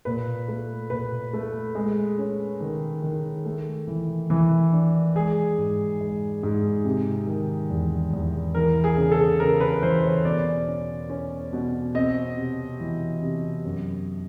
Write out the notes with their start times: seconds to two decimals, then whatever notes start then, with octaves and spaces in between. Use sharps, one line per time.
0.05 A#2 B4
0.48 A3
0.90 A#2 B4
1.33 A3
1.75 G#3
2.18 C#4
2.60 D#3
3.02 D#3
3.45 A3
3.87 E3
4.30 E3
4.73 D4
5.15 G#3 G#4
5.58 G#2
6.01 G#3
6.43 G#2
6.84 C3
7.27 D#3
7.70 E2
8.13 E2
8.55 E3 A#4
8.84 G#4
8.97 C#3
9.12 A4
9.40 C#3 A#4
9.60 B4
9.82 E3 C5
10.04 C#5
10.25 B2 D5
10.68 C#4
11.10 C#4
11.53 B2
11.95 C4 D#5
12.37 C3
12.80 E3
13.22 C3
13.65 F#2